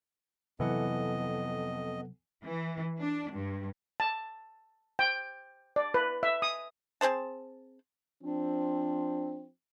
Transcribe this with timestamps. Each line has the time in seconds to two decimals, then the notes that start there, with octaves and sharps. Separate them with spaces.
0.60 F2 C3 E3 F#3 B3 A4 D#5 F#5
2.44 E3
2.99 D4
3.32 G2
4.00 A5
4.99 G5
5.76 D5
5.94 B4
6.23 E5
6.42 D#6
7.01 C4 G#4 C5 A5
8.23 F3 C4 D4